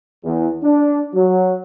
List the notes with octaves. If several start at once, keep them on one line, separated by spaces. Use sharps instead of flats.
E2
D4
F#3